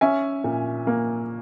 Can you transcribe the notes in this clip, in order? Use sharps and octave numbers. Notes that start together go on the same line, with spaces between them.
C#4 E5 G#5
A#2
A#3